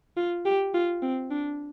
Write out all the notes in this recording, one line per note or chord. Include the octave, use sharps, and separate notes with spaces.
F4
G4
F4
C4
D4